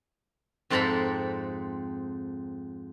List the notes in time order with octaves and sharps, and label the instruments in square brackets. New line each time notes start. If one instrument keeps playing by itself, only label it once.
[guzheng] F2 G#2 C4 A4 A#5 B5